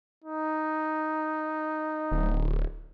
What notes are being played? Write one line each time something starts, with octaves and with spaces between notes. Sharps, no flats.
D#4
D1